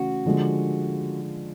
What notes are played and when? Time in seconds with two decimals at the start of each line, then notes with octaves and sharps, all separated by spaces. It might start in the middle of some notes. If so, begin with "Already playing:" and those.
Already playing: C#3 E3 A3 C#4 F#4
0.26 D3 F3 G#3